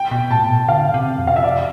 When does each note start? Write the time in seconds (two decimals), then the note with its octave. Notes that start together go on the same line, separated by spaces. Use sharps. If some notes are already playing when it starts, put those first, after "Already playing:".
Already playing: G5
0.11 B2
0.31 A2 A5
0.49 B2
0.68 D3 F5
0.94 C3
1.19 F2
1.27 F5
1.36 E5
1.44 D5